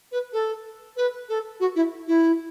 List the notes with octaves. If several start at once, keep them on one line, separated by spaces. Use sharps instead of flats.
B4
A4
B4
A4
F#4
E4
E4